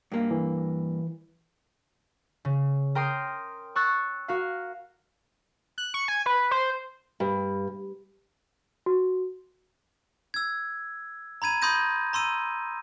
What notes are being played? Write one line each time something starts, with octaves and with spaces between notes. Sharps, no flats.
G2 A#3
E3
C#3
A#4 G5 C6 D#6
C#6 E6 F#6 A6 C#7
F#4 A#4 F5
F#6
C#6
G#5
B4
C5
G2
F#4
E6 G#6
A#5 B5 G#6 D#7
B5 C6 D#6 G6 A#6 D#7
A#5 C6 E6 D#7